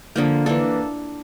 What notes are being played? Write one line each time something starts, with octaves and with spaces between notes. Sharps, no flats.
D3 F3 A#3
E3 A#3 D4 A4